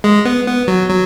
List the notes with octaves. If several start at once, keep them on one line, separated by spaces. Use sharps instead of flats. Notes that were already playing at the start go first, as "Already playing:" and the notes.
G#3
B3
B3
F#3
F#3